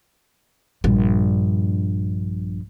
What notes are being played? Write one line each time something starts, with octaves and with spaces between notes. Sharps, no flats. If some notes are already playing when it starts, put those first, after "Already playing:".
A#1 G2